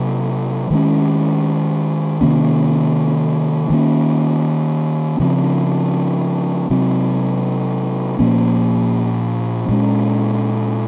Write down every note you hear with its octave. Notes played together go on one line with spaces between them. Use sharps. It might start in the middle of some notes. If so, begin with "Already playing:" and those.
Already playing: C3 F#3 A#3
D#3 G#3 C#4
C3 D#3 A#3 C#4
D#3 A#3 C#4
C#3 F3 C4
C3 F#3 C4
A#2 F3 A#3 C#4
A#2 G#3 C#4